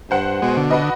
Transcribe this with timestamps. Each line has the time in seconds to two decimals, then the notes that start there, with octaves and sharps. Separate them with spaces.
0.11 G2 C5 F#5
0.42 B2 G#3
0.57 D3
0.70 F#4 B4 D#5